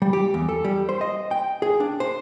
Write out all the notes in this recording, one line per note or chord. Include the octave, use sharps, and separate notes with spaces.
G3
G4
E2
A4
G3
C5
D#5
G5
G#4
D4
C5